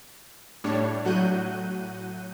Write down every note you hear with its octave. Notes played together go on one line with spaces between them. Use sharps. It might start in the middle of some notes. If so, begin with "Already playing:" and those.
A2 G3 D4 C#5
A2 F#3 F#4 F#6 G6 D#7